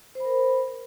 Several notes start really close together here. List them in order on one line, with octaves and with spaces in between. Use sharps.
C5 B5 A#4